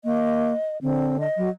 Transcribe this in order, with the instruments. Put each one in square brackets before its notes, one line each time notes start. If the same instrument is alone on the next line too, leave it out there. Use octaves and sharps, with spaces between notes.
[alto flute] A#3 [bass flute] D#5
[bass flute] D3 [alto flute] C4
[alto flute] D#5
[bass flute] F#3